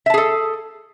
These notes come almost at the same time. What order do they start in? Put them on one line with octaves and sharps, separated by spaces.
E5 A5 G#4 A4